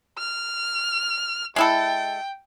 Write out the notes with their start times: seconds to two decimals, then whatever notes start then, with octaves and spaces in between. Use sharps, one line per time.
0.18 F6
1.56 G#3 E4 A4 G5